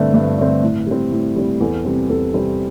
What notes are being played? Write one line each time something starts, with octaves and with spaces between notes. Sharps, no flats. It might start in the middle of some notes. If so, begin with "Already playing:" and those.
Already playing: G2 D3 A3 C4 B4
G2
D3 A3 C4
A2
G3 C4
A2
G3 C4
E2 A4
C3 G3 C4
E2 A4
C3 G3 C4